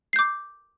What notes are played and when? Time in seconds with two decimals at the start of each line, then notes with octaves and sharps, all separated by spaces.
0.13 C7
0.16 G6
0.19 D6